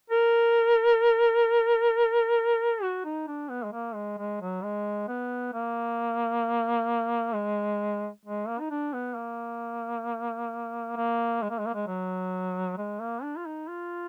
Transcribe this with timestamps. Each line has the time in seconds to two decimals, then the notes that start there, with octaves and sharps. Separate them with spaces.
0.10 A#4
2.82 F#4
3.05 D#4
3.27 D4
3.49 B3
3.64 G#3
3.72 A#3
3.94 G#3
4.18 G#3
4.41 F#3
4.63 G#3
5.08 B3
5.53 A#3
7.34 G#3
8.25 G#3
8.48 A#3
8.60 D#4
8.70 D4
8.93 B3
9.16 A#3
10.97 A#3
11.42 G#3
11.50 A#3
11.58 G#3
11.67 A#3
11.74 G#3
11.87 F#3
12.78 G#3
13.00 A#3
13.23 D4
13.36 F4
13.46 D#4
13.68 F4